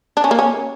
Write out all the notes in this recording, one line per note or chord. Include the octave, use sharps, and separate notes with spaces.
D4
C#4
A#3
C#4